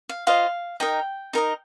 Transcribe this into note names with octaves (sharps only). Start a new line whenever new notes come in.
F5
F4 C5 D#5 F5
D#4 A#4 D#5 G5
D#4 A#4 D#5